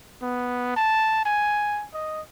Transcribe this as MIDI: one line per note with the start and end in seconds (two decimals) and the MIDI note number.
0.22 0.73 59
0.77 1.25 81
1.26 1.85 80
1.94 2.21 75